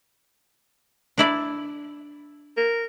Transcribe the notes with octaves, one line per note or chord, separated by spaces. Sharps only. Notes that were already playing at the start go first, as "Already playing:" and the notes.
D4 E4 D5
A#4